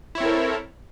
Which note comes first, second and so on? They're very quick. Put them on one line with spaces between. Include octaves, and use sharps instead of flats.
E4 C#5 C4 A4 A#4